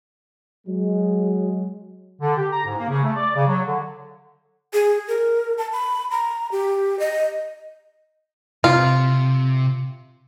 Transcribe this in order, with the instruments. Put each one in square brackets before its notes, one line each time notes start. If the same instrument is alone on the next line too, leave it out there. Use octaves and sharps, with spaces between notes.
[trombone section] F#3 G#3
[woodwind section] D3
G4
A#5
G#2
A#3
C#3
A3
D5
C#3
F#3
D3
[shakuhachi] G#4
A#4
A5
B5
A#5
G4
D#5
[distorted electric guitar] C3 [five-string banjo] F4